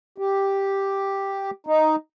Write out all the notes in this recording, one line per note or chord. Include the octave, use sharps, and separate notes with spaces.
G4
D#4